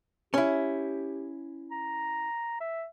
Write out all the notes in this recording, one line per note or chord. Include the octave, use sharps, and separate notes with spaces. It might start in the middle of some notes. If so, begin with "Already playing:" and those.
C#4 E4 G4
A#5
E5